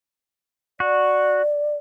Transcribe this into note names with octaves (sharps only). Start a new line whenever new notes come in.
F#4 D5